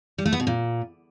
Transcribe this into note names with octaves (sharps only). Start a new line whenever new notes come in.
G3
A3
B3
B2
A#2